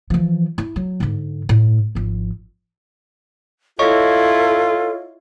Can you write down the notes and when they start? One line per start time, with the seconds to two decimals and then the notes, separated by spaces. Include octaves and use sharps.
0.10 E3 F3
0.58 E4
0.76 F#3
1.00 G#2 D3
1.49 A2
1.95 G#1 F3
3.79 E4 F4 A4 C#5 D#5 C#6